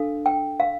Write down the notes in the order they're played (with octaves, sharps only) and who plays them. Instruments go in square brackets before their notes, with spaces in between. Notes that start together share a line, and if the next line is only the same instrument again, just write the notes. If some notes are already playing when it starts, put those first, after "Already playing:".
Already playing: [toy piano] D4 A4 F5
G5
F5